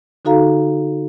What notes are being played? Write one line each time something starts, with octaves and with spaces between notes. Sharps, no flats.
D3 D#4 F#4 A4 F5 A#5